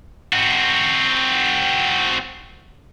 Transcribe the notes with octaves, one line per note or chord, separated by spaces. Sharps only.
C4 F#4